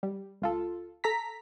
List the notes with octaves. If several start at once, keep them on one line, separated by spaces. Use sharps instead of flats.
G3
C#2 F4 A4
A4 A#5 B6